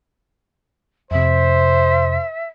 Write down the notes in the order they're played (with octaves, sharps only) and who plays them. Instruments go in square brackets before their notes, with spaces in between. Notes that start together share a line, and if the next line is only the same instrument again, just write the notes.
[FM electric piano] F2 C3 [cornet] C5 [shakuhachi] E5